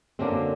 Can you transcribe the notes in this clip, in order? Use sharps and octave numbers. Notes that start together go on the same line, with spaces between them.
F#2 D3 F#3 A#3 C4